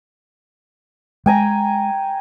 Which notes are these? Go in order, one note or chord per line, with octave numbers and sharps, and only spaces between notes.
G#3 G5 G#5 A#5